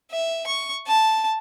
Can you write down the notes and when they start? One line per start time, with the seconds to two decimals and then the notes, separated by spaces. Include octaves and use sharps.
0.12 E5
0.47 C#6
0.87 A5